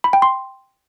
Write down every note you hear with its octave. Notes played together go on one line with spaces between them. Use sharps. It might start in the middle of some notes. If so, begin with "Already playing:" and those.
B5
G5
C6